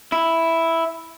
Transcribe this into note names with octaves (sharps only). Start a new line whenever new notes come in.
E4